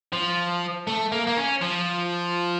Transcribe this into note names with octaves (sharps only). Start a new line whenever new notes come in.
F3
A3
A#3
A#3
C#4
F3